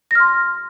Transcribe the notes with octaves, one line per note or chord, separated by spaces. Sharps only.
C6 F6 A#6